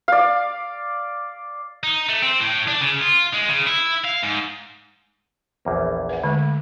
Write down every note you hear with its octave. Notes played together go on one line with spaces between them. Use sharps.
D5 F5
D#4
A3
C4
A2
D4
C#3
F4
G#3
C#3
E4
F5
G#2
A#1 E2 A#3
B4 F#5
D3 G#3 A3